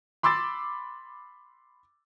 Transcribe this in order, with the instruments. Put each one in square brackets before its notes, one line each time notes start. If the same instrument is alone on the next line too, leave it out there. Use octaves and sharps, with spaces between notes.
[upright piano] B5 C6 D6 E6 A6